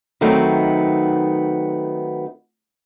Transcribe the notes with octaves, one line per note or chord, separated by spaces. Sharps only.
D#3 F#3 A3 B3 C4 D#4